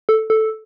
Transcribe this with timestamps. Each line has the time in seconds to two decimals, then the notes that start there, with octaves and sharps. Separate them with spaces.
0.09 A4
0.30 A4